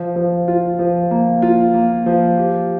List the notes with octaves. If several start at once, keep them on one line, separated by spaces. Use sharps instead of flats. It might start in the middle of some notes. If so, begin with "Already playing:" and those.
Already playing: F3
F3
F4
F3
A#3
F4
A#3
F3
G4